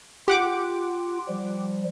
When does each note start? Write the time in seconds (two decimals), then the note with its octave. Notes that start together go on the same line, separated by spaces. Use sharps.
0.28 F4 G4 F#5 D6
1.28 F3 G3